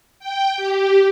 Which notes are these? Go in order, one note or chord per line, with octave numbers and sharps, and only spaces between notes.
G5
G4